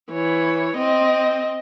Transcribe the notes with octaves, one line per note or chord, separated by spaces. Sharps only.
E3 C#5
C4 D#5